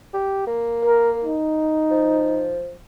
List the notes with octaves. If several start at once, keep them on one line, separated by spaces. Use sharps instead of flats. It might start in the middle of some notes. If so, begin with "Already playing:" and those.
G4
A#3
A#4
D#4
F3